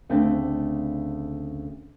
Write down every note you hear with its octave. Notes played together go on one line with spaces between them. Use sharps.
D2 C#3 A3 C4 D4